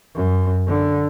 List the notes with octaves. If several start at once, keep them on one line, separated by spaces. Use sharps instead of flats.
F#2
D3